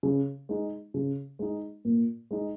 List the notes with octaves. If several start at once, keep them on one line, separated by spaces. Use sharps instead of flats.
C#3
G#3 D#4
C#3
G#3 D#4
A#2
G#3 D#4